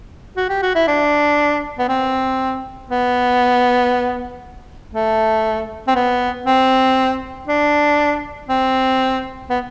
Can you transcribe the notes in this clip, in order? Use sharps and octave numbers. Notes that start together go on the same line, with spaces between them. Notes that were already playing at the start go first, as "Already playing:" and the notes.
F#4
G4
F#4
E4
D4
B3
C4
B3
A3
C4
B3
C4
D4
C4
B3